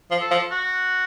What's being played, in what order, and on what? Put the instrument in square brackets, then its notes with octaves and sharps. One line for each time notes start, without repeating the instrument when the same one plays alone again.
[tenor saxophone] F3
[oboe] A4
[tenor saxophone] F3
[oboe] F#4